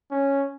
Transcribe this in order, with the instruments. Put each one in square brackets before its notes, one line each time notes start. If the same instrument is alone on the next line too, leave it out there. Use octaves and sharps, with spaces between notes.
[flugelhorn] C#4